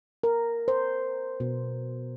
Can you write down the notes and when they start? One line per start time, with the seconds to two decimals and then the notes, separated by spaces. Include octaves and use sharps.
0.23 A#4
0.68 C5
1.40 B2